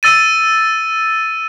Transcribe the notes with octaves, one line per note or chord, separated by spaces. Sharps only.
E6 A6 D#7